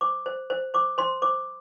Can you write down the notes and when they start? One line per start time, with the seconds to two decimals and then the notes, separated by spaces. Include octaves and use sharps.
0.01 C5 D6
0.26 C5
0.50 C5
0.74 C5 D6
0.98 C5 C6
1.22 C5 D6